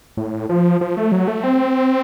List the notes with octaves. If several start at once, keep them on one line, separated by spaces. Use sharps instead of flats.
A2
F3
F3
A3
F#3
A3
C4